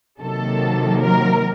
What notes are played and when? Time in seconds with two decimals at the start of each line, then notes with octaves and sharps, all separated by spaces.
0.21 C3 D#3 F#3 A#3 A4
1.01 A#4